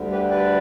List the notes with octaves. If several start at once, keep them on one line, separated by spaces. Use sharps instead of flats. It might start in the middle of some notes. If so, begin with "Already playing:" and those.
Already playing: D2 D3 G3
G4 B4
B4 D5